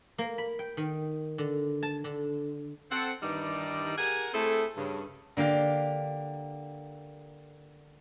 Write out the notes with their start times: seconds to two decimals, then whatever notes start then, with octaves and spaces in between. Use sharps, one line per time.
0.18 A#3
0.38 B5
0.59 G5
0.77 D#3
1.38 D3
1.83 A5
2.04 D3
2.91 C4 A4 F#5
3.23 G2 D#3 E3 G3 D#4 D5
3.98 G4 G#4 A#4 F#5 G#5
4.33 A3 C4 E4 G#4 A4
4.77 G2 C#3
5.37 D3 A#3 G4 F5